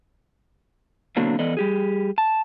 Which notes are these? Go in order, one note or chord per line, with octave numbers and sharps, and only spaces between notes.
B2 D3 F#3 A#3 C4 D4
E3 B3 A4 D5 D#5
G3 G4 G#4
A5